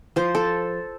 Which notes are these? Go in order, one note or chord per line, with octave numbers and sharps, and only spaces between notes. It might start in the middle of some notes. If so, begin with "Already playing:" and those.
F3 C5
A4